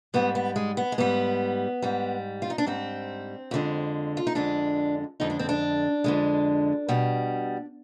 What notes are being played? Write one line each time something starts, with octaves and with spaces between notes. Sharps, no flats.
G#2 G3 B3
B3
G#3
B3
G#3
G#2 G3 B3
G#2 G3
F4
D#4
D4
G#2 G3 C4
F2 D3 G#3
F4
D#4
F2 D3 G#3 D4
F2 D3 G#3 D#4
D4
C4
D4
F2 D3 G#3
B2 G3